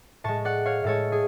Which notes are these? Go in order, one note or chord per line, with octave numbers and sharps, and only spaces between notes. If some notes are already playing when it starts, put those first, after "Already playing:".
A2 G#3 A5 C#6
D5 F#5
C#5 F5
A2 G#3 A4 C#5
G#4